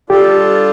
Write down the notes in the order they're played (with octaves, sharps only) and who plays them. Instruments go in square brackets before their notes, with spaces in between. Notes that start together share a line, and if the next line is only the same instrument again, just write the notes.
[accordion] G3 D4 F4 A4 [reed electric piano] G4